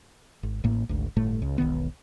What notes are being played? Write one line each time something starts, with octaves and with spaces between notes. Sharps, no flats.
G#1
A1 A2 A#3
G#1 D2
G1 A2 A3
C#2
E1 B1 D#3 B3